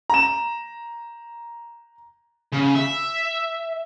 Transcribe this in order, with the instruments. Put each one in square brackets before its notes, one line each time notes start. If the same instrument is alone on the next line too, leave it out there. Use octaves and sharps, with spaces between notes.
[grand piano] A#5 E7
[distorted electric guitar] C#3
E5